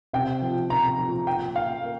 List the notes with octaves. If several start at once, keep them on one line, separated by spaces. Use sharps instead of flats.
C3 G5
F3
C3 A#5
F3
A#2 G5
A#2 F5
A#3